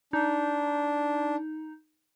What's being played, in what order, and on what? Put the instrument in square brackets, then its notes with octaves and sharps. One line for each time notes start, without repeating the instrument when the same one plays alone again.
[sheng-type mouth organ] D4 [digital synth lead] D#4